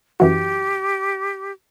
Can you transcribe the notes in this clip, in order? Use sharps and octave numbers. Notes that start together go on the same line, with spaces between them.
F#2 E3 F#3 G4